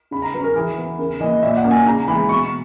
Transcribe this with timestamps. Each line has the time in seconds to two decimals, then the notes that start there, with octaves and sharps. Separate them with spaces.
0.11 C#3 B5
0.22 A#5
0.34 F#3 B4
0.37 C#4
0.44 A#4
0.56 E3 G#4
0.78 B3
0.99 C#3 A#4
1.20 E3 D#5
1.23 A#3
1.43 A#2 E5
1.57 F#5
1.64 A#3 C#4
1.71 G#5
1.86 C#3 A#5
2.08 E3 G#3 B3 B5
2.29 B2 C#6